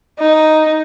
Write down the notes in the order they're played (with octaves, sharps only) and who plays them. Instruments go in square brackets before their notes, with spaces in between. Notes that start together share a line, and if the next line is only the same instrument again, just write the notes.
[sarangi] D#4